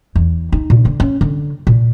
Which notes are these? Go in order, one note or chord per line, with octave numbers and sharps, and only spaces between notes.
E2
D#4
A#2
D3
C#4
D3
A#2